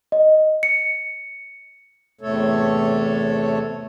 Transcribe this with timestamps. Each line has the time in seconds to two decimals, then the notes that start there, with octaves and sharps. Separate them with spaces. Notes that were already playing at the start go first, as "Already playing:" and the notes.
0.12 D#5
0.63 C#7
2.21 E2 A2 C3 A3 A4 C#5